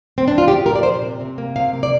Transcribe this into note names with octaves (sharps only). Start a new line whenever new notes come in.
C4
D4
F4
F3 G4
A#2 A#4
D5
A#2 C5
C3
C3
A#3
C3 F5
A#3
D5